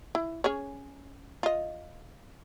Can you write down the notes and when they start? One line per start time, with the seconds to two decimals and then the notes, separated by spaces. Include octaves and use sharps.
0.15 E4
0.44 C#4 G#4 C#5
1.43 F4 D#5